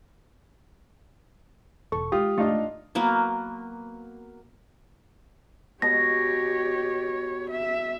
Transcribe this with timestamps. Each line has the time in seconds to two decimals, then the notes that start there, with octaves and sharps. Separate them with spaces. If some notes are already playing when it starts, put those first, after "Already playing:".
1.92 E1 A4 C#6
2.12 G#3 F4 G4 D#6
2.38 G1 C#2 A3 D4 D#4 F4
2.95 F#3 A#3 B3
5.82 B2 G4 C#5 A#6
7.50 E5